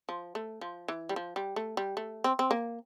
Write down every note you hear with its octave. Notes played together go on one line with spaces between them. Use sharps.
F3
A3
F3
E3
G3
F3
G3
A3
G3
A3
C4
C4
A#3